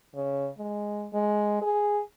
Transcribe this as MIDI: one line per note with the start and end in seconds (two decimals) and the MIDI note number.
0.15 0.49 49
0.58 1.08 56
1.13 1.62 56
1.62 2.01 68